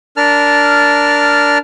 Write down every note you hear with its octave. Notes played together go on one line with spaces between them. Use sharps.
D4 A#4 A5 F6